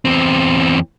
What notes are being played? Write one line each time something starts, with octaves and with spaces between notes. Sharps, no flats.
E2 C4